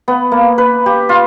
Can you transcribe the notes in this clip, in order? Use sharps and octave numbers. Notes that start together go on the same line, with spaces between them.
B3
A#3
B4
G4
F4